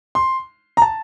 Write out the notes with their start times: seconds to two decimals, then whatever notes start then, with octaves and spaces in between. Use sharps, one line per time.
0.15 C6
0.77 A#5
0.82 A5